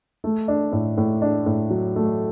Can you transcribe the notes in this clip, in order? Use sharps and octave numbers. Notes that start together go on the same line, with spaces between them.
A3
D4
A2
A2
D4
A2
F#3
A3